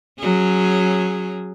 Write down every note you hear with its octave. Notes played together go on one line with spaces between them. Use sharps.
F#3 C#4 G#4